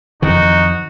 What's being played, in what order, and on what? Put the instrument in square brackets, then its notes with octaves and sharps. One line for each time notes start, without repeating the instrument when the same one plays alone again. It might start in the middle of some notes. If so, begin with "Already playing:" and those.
[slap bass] F2 D#3 E3 [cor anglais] D#4 [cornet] F#4